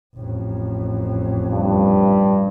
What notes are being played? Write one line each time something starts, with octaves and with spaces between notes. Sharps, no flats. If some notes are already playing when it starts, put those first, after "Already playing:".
A1 F2
G2